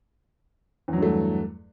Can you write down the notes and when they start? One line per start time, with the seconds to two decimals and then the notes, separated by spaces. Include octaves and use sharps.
0.88 E2
0.93 F#3
0.98 G2
1.02 A3